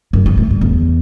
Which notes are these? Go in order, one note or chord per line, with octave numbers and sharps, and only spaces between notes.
F#2
G2
A2
G2
E2